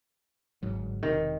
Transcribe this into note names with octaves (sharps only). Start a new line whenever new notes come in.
G1 G#2 F#3
E1 C3 D#3